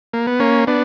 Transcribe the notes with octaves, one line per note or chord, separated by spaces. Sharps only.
A#3
B3
A#3 C#4
B3 D4